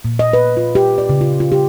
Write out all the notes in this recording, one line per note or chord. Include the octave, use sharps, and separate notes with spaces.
A#2
D#5
B4
F4
G4
D5
C#3
F4
F4
G4